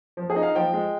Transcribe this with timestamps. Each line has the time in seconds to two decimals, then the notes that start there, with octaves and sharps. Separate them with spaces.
0.17 F3
0.30 G#4
0.36 D#4
0.43 F5
0.55 F3 G5
0.73 G#3